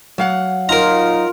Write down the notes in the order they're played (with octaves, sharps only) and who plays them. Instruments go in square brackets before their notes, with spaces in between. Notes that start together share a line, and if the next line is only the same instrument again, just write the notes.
[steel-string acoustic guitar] F#3 F5 F#5
[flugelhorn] D#4 [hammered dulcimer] F4 [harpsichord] A#4 A#5